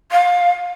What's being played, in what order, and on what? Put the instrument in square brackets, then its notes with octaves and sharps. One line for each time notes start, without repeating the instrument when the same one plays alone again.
[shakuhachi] F5